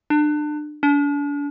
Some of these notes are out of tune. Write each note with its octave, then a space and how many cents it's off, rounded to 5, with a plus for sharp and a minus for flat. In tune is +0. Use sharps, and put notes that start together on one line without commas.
D4 +30
D4 -40